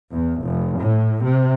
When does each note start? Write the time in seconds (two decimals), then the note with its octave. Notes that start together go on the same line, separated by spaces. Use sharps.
0.14 E2
0.43 F1
0.78 A2
1.25 C3